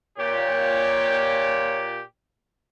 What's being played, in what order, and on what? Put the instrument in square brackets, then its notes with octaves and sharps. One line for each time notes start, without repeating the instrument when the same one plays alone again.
[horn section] A#2 G4 [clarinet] C#5